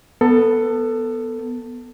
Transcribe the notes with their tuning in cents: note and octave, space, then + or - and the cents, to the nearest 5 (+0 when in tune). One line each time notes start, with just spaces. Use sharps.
B3 +0 A4 +15